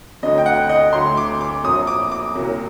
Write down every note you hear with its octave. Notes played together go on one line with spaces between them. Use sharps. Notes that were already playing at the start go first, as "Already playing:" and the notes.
D2 D3 F#3 D#5
G5
F#5
D#5
D2 D3 F#3 C6
D6
D6
A#1 A#2 F#3 D#6
D6
D6
C2 A#2 F#3